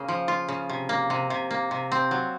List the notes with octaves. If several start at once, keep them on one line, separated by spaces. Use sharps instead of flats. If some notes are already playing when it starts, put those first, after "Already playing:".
Already playing: C#3 A#3
F3
F4
C#3
C3
A#3
C3
C3
A#3
C3
C4
F#3